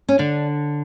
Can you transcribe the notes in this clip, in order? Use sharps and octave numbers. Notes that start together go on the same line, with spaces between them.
C#4
D3 D4